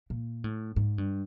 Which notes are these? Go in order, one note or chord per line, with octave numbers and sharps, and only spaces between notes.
A#2
A2
G#2
G2